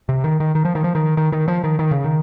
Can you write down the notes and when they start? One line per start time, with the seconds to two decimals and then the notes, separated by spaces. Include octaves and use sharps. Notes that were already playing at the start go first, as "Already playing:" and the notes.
0.09 C3
0.24 D#3
0.40 D#3
0.55 D#3
0.65 F3
0.75 D#3
0.84 F3
0.95 D#3
1.17 D#3
1.32 D#3
1.48 F3
1.64 D#3
1.79 D#3
1.91 C#3
2.04 D#3